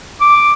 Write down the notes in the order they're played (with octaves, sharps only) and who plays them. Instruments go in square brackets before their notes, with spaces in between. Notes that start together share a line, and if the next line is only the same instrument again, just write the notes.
[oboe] D6